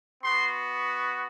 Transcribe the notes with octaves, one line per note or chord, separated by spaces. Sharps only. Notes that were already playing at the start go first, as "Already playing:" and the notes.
B3 F#4 C6